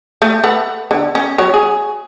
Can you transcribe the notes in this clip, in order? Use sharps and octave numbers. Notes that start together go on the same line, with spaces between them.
A3
A4 B4 F#5
D3
C#4
F#3 C#5
G#4